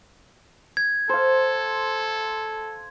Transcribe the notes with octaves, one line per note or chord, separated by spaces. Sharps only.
G#6
A4 C5 F5